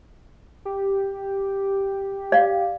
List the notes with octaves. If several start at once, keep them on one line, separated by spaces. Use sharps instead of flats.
G4
D5 F5